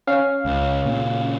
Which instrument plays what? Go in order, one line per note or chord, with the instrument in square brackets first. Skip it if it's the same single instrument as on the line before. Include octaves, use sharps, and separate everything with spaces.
[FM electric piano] C#4 F5
[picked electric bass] C#2
A#2 C#3